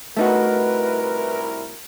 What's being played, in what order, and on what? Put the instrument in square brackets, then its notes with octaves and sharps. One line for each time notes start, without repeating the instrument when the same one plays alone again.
[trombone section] C2 E4 A#4 [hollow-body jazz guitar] A3 D#4 F#4 [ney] B4